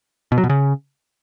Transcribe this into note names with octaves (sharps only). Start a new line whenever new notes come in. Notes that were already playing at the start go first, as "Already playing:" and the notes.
B2
F#3
B2
C#3